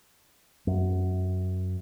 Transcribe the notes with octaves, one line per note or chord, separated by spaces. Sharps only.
F#2